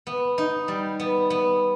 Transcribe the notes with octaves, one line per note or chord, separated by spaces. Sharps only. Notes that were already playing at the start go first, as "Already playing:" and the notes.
B3
D#4
G3
B3
B3